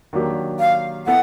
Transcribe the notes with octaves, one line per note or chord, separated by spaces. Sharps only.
D#3 F#3 A#3 D4 G4
F5
B3 E4 A4 F#5